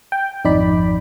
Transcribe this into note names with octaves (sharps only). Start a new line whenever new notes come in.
G5
G#1 F2 D#4 D5 B5